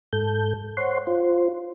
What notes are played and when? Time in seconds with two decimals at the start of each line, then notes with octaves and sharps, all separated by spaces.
0.13 G#2 A4 G6
0.77 C5 C#5 F#5 C6
1.07 F4 C5